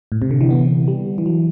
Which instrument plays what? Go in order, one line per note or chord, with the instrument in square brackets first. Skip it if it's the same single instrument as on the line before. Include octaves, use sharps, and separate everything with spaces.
[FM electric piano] A2
C3
D3
E3
B3
G3
E3
F#3